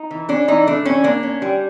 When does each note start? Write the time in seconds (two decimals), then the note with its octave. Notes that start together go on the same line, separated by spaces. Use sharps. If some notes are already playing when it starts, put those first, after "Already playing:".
Already playing: D#4
0.11 E3
0.29 C#4 D4
0.48 E3 D#4
0.67 A3 D4
0.85 E3 C#4
1.04 A#3 D4
1.23 C#4
1.42 G3